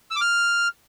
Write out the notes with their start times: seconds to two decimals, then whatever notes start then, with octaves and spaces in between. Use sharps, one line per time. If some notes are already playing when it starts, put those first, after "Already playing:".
0.11 E6
0.16 D6
0.21 F6